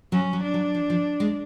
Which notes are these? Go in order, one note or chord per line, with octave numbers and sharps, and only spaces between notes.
F#3 C#4
F#3
D4
F#3
F3
F3
G#3